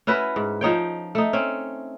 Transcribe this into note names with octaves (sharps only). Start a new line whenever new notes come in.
C#4 E4 F#4 B4
G#2
F3 D#4 C#5 G5
A3 D#4
C4 C#4